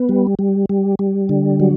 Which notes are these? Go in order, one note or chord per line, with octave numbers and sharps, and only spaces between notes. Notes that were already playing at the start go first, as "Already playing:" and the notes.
Already playing: B3
G3
G3
G3
G3
D3
F#3